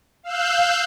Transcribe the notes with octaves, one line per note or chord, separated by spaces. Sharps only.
F5 E6 F#6 G6